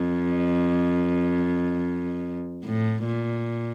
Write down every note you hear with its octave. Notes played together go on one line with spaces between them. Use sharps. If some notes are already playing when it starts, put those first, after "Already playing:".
Already playing: F2
A2
A#2